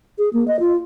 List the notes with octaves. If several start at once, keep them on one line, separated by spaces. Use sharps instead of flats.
G#4
A#3
D#5
F4